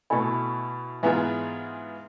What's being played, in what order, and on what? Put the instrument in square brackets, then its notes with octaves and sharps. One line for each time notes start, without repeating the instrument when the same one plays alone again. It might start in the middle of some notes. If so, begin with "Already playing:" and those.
[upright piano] B2 A3 E4 A4 [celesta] G#5 B5
[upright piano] G#2 E3 B3 F4 G#4 [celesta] E5 G#5